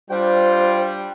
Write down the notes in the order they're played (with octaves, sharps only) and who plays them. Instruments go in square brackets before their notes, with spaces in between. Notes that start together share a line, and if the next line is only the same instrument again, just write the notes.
[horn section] G3 D4 G5 [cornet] F4 [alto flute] C5